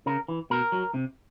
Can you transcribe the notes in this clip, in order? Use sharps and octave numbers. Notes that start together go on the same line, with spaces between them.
C#3 A#4
E3
B2 A#4
F#3
C3